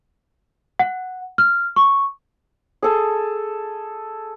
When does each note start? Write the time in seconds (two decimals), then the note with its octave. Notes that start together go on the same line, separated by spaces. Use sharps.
0.79 F#5
1.38 F6
1.76 C#6
2.82 G#4 A4